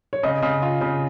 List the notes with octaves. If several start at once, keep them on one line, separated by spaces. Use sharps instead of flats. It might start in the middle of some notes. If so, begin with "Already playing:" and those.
C#5
C#3 D#5
C#3
F4
C#3